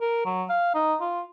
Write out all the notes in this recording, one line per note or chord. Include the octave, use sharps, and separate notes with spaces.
A#4
F#3
F5
D#4
F4